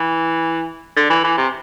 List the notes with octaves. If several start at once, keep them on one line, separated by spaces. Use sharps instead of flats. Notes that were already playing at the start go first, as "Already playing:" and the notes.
Already playing: E3
D3
E3
E3
C3